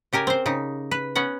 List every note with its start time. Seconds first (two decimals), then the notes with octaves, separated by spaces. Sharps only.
0.13 C#3 G4 A#4 G#5
0.27 C4 C5
0.46 C#3 D#4
0.91 B4
1.15 B3 C#4 F#5